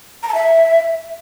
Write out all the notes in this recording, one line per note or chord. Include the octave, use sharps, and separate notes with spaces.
A#5
A5
E5